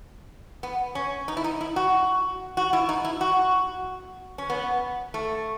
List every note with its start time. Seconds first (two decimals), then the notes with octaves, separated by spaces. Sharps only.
0.63 B3
0.95 C#4
1.28 D#4
1.37 E4
1.44 D#4
1.61 E4
1.76 F#4
2.57 F#4
2.73 E4
2.89 D#4
3.04 E4
3.21 F#4
4.38 C#4
4.50 B3
5.14 A3